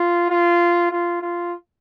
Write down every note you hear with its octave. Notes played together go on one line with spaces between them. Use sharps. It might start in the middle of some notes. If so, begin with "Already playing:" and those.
Already playing: F4
F4
F4
F4